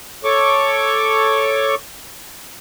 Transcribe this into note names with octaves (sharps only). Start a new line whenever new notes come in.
A4 C#5 C#6 D6